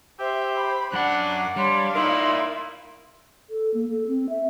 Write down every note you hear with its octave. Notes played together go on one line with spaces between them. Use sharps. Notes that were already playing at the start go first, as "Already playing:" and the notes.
G4 C5 E5
B5
F#2 D4 F#5 F#6
A#5 D6
G3 D4 C#5 F5 B5 C6
D#4 E4 A#4 D5 E5 C6
A4
A#3
A4
C4
E5